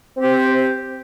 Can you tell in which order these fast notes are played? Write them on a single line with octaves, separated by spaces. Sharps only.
C4 G4 C5